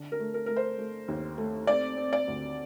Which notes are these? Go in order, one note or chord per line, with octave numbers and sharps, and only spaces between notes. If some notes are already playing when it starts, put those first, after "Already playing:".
Already playing: D3
A#4
A3
A#4
A3 A#4
C5
A3
D#2
A3
C4 D5
C4
D5
D2